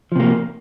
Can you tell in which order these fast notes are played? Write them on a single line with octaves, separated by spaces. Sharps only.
F3 C3 A#3